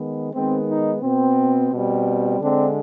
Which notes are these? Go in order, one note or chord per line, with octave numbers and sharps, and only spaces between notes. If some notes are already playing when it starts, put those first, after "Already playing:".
Already playing: D#3 G#3 B3
D#3 G#3 B3 C4
D#4
B2 B3 C4
B2 G3 C4
D3 G#3 C4 D4